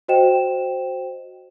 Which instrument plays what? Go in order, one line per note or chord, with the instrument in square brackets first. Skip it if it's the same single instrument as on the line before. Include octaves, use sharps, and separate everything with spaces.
[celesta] F#4 C5 D#5 G5 E7